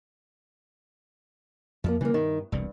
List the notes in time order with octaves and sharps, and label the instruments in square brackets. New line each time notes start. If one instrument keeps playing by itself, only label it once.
[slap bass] F2 [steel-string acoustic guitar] F3 G#3 A#3
[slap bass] C#3 G3 B3 [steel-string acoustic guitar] E3 A#3
[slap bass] G2 [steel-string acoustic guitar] D#3
[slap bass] E1 C2 C3 [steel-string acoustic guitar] G2